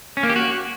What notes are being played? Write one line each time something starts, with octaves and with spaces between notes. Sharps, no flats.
C#4
A#3
G4
F#4